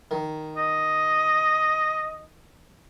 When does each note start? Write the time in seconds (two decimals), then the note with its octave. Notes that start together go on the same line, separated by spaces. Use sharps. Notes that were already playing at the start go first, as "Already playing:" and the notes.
0.11 D#3
0.56 D#5